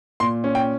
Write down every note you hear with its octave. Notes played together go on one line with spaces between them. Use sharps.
A#2 C6
C#4
G5